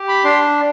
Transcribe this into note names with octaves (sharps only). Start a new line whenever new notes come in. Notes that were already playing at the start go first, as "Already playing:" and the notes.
Already playing: G4
B5
D4 C6